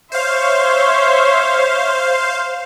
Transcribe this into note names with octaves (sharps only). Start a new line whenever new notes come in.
C5 C#5 E5 F5 C6